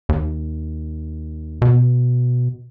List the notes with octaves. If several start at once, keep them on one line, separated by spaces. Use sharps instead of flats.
D#2
B2